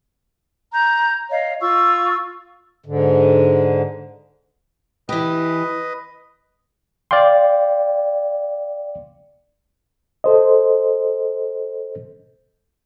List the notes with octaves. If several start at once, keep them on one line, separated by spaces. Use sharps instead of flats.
A#5 G6
C#5 D#5 F5
F4 C#6 E6
G#2 D3
E3 G4 B4 D#5
D5 F5 G5 C6
A4 C5 D#5